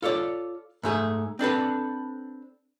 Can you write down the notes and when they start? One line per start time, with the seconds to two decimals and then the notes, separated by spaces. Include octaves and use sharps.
0.02 F4 A4 C#5 D5
0.83 G#2 A3 G#4
1.39 C4 D4 A4 B4